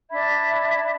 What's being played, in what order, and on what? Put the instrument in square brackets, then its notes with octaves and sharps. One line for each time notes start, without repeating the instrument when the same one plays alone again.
[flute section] D4 B5 G#6 [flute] E5